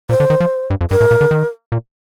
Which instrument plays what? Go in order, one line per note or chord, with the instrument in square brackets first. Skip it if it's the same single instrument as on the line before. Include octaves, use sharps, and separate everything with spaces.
[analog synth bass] A#2 [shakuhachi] C5
[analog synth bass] D3
D#3
F3
G2
F2
[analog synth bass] G2 [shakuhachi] A#4
[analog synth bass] A2
A#2
D3
D#3
A#2